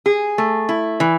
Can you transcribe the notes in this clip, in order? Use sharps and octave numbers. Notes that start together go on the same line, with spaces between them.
G#4
A3
E4
E3